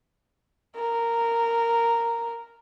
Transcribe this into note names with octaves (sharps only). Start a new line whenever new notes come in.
A#4